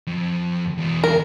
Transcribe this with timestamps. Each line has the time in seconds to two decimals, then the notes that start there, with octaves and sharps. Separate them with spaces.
0.07 F2
0.78 E2 G#3
1.04 A#4